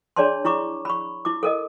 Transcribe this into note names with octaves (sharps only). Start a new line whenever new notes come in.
D4 G#4 C#5 D5 A5 C6
E4 A#5 C#6 D6
B5 C#6
E4 D6
A4 A#4 D#5